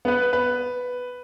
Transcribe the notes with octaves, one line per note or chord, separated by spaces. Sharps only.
B3 B4
B4